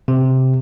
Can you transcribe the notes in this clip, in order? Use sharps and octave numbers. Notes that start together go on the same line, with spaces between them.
C3